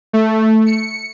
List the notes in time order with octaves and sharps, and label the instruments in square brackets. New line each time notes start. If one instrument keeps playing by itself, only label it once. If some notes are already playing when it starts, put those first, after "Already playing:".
[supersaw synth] A3
C#7